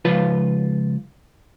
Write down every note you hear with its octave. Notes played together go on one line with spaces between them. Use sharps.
C#2 F3 F4 B4